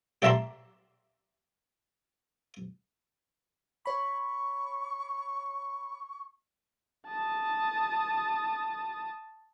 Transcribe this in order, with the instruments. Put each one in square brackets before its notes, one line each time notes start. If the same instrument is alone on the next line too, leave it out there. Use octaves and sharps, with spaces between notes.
[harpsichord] G4 D5 E5 A5 A#5 C6
[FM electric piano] C#5 B5 [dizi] C#6
[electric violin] A5 D#6